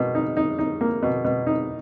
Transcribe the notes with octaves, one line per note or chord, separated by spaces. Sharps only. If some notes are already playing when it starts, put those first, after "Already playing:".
Already playing: B2 A#3
D#4
D#4
D#4
A#3
B2
B2
D#4